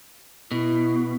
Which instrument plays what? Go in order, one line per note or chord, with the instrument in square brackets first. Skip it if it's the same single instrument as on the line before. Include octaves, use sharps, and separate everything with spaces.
[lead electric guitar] B2 [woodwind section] E4